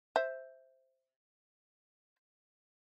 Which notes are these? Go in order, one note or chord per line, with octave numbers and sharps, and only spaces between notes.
C5 E5